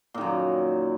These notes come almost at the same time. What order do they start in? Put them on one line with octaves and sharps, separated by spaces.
A#2 D#3 F#2